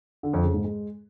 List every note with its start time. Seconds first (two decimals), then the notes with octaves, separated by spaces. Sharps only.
0.23 D3
0.33 F2
0.44 C#3
0.54 G#2
0.64 G#3